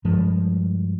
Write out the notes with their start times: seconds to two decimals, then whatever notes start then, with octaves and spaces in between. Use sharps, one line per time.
0.05 G2 F3 G#3